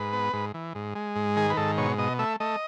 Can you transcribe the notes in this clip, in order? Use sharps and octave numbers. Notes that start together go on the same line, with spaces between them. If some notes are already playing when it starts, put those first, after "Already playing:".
Already playing: G#2 B4
B3
G#2
E3
G#2
G#3
G#2
D#3 G#4
B4
G#2 A4
B2 C#5
B2 D#5
A3 E5
A3 D#5